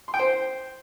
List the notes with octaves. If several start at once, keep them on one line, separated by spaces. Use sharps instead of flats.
C6
G5
C5